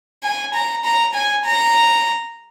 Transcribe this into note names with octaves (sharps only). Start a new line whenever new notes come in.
G#5
A#5
A#5
G#5
A#5